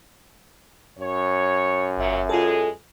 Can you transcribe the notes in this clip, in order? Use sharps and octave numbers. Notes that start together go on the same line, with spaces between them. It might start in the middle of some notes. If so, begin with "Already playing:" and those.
F#2 C#5
G1 A#2 F#3 E5
E3 G#3 F4 G#4 A4